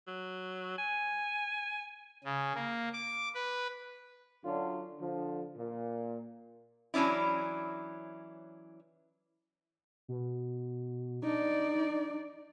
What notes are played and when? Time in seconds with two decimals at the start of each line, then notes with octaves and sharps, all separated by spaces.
0.07 F#3
0.78 G#5
2.24 C#3
2.55 A#3
2.93 D6
3.34 B4
4.44 F#2 D3 F#3 C#4 D4 F4
4.99 D3 F3
5.56 A#2
6.94 E3 F#3 C#4 D4 E4
10.08 B2
11.23 D4 D#4 D5